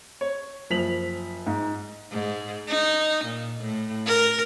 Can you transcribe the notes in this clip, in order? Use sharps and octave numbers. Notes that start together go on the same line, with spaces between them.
C#5
F#1 F3 B6 F7 F#7
G#2
G#2
D#4
A#2
A2
A#4